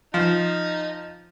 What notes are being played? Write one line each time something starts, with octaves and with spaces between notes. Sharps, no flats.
F3 D#4